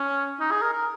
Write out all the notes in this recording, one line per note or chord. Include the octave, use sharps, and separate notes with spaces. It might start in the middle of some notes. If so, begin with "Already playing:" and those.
Already playing: C#4
D#4
G#4
A#4
A#4